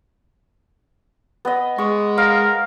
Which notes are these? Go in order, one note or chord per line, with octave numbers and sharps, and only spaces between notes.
B3 D#5
G#3 C#6
A#4 F5